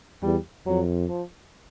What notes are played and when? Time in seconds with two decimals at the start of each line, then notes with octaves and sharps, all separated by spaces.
0.23 E2 G3
0.66 F2 F#3
1.09 F3